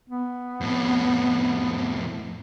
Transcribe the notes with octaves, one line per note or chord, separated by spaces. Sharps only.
B3
F2 A2